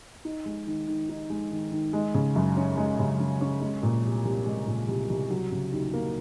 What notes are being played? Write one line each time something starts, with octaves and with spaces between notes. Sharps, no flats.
D#4
G#3
D#3
D#3
D#4
G#3
D#3
D#3
G#3
C#3
F#2
C#4
G#3
C#3
F#2
C#4
G#3
A#2
C2
C2
G#3
A#2
C2
C2
F#3
C#3
D#2
A#3